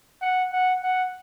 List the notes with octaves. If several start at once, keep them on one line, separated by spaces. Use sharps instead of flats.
F#5
F#5
F#5